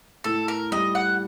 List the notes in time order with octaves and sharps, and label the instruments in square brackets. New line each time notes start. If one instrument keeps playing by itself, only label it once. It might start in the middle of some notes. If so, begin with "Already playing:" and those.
[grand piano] A2 [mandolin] A4
[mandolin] A#4
[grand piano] G3 [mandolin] D#5
[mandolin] F#5